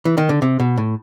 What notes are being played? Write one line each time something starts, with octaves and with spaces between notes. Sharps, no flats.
E3
D#3
D3
C3
B2
A2